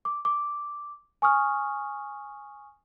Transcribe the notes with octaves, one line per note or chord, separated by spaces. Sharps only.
D6
D6
G#5 C#6 D#6 F6